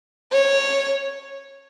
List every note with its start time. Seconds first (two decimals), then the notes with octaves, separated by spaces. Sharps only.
0.32 C#5